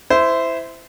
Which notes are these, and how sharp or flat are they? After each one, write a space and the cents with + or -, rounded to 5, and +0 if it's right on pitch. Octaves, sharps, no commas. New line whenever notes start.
E4 +0 C5 -20